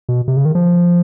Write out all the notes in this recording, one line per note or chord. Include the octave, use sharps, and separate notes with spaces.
B2
C3
C#3
D#3
F3